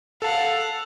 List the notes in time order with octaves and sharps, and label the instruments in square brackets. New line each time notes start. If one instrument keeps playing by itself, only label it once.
[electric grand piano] A4 A5 [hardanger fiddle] F5 F#5